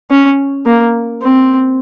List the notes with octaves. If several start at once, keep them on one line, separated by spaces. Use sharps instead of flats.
C#4
A#3
C4